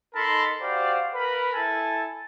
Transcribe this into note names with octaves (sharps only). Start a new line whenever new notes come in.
D#4 A4 A#4 A5 B5 C6
F#4 G4 C5 D5 F5
A#4 B4 B5
E4 A4 G#5 A5